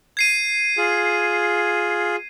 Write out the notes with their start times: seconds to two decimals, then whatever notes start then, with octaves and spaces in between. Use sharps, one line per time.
0.17 G#6 C7 D#7
0.77 F4 G#4